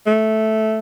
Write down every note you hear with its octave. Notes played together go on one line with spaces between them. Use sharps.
A3